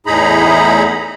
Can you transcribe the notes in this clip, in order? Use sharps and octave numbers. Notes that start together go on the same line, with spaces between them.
E2 A2 D#4 G#4 A#5 B5